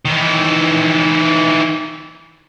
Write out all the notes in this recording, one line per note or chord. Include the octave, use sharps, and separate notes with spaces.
D#3 E3